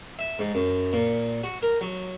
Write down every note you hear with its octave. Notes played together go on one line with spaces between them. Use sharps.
E5
G#2
F#2
A#2
F#4
A#4
F#3